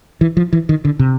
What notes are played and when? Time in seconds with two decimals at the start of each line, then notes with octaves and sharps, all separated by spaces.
0.21 E3
0.37 F3
0.53 E3
0.69 D#3
0.85 D3
0.99 C3